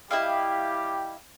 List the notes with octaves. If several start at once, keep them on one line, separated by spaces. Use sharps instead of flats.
G3 E4 G4 D#5 F5